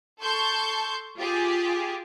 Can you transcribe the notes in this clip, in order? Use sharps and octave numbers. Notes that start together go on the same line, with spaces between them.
A4 A5 C6 C#6 G6
F4 G4 G#4